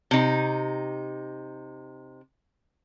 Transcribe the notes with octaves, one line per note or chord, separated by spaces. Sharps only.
C3 D#4